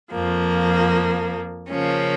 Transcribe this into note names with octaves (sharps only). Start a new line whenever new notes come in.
F2 F3 A#3
C#3 F3 A#3 C#4